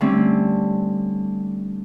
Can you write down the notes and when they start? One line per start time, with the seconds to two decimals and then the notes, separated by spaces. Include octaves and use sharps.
0.01 D3 G3 A3 C4 C#4